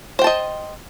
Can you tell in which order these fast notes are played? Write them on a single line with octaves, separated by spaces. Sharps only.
C5 G5 A5 D#5